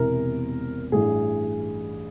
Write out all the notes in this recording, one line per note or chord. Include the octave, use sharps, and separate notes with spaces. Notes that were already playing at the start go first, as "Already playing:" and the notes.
Already playing: E1 E2 C3 E3 A#4
A1 G2 E3 G#4